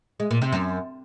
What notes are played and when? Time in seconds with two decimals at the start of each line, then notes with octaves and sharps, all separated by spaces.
0.20 G#3
0.31 A#2
0.42 C3
0.52 F#2